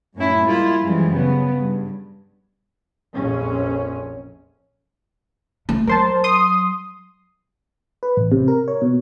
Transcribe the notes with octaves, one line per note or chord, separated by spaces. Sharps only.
F#2 A2 C#4 E4
G3 G#3 A#3 E4 F4
F#2 E3 F3 G3 G#3
C#3 B3
G2
A#1 F2 C#4
A3
F#3 A#4 C5 A5
C6 D#6
B4
A1
C3
A#4
C#5
B2